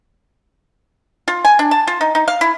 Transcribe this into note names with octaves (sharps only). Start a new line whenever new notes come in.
F4
G#5
D4
A5
F4
D#4
D#4
F5
E4